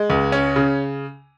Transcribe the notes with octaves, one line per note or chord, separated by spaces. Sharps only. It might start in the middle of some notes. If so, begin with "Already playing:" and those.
Already playing: G#3
C#2
C#4
C#3